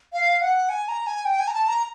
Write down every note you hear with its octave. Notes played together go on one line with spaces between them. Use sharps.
F5
F#5
G#5
A#5
G#5
G5
G#5
A#5
A5
A#5